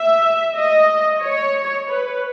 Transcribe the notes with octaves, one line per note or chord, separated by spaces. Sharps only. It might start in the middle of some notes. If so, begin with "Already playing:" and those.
Already playing: E5
D#5
C#5
B4